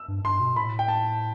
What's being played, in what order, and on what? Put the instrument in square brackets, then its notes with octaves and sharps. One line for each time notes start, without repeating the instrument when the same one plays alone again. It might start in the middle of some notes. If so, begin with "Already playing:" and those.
Already playing: [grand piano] E6
[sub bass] G2
[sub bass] G2 [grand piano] C6
[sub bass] B2
[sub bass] A2 [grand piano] B5
[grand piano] G5
A5